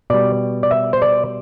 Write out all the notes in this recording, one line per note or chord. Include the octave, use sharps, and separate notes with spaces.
B2 G3 D5
D5
E5
C5
D5